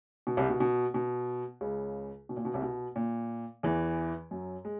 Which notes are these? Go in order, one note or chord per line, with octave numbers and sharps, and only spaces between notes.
B2
C2 C3
B2
B2
B2
C#2 C#3
B2
A#2
B2
C2 C3
B2
A#2
E2 E3
F#2 F#3
G#3